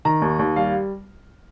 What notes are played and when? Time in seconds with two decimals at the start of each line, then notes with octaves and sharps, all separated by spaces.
0.05 D#3 A#5
0.22 D#2
0.39 D#2
0.56 G3 F5